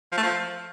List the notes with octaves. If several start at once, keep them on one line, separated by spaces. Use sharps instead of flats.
F3
A3
F3